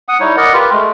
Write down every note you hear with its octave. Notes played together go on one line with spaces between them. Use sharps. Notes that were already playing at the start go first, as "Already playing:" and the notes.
F#5 D#6
G3 D#4 E4 C#5
A#4 D5 D#5 F#5
F4 G4 A#4 B4
G#3 A3